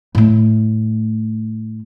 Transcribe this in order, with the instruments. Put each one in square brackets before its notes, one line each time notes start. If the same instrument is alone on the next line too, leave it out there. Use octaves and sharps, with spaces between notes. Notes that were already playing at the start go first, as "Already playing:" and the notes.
[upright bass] A2 A3